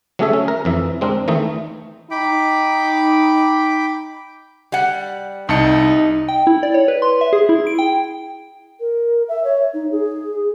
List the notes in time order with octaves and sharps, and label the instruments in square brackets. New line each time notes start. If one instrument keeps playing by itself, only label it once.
[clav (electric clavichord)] F#3 A3 C#4 G#4 A4 E5
C#4
A#4
F2 E3 E5
G#3 C4 D4 A#4
D#3 E3 A3 D#4
[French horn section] D#4 [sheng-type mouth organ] G5 B5 D6
[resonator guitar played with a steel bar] G3 F#5
[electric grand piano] C2 A5 C#7 [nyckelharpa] D#4
[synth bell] G5
E4
D5
C#5
B4
C6
E5
G#4
E4
D7
G5
[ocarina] A#4
E5
C#5
D#4
G#4